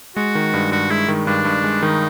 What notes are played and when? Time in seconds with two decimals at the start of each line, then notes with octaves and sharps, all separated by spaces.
0.16 G#3 F#4
0.35 D#3
0.53 G2
0.72 G2 F#4
0.90 G#3 E4
1.08 D#3
1.27 G2 D4
1.45 G2
1.64 G#3
1.82 D#3 D#4